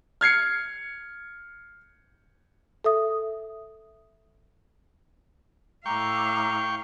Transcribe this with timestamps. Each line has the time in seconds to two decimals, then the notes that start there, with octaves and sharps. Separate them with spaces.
0.21 F6 G#6 C7 C#7
2.84 A4 E5 D#6
5.86 A2 F5 G5 A#5 C#6 D6 E6